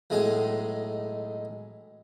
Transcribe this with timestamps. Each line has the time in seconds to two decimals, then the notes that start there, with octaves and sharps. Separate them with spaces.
0.10 B1 A2 G#3 G#4